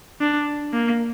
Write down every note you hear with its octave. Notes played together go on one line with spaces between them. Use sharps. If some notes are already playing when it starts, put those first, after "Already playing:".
D4
A#3